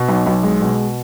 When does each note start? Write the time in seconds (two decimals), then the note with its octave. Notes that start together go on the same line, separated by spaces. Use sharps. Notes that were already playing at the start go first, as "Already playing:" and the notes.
Already playing: B2
0.09 B1
0.26 B1
0.43 G#3
0.62 B2